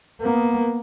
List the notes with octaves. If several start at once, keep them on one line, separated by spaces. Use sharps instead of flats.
A#3 B3